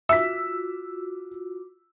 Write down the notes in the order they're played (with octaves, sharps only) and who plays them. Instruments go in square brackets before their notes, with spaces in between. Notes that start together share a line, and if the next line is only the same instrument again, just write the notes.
[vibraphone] F4 F#4 D6 [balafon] E5 [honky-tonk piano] E6 B6